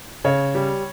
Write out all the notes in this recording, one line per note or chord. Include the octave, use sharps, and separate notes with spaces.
C#3 C#5
G3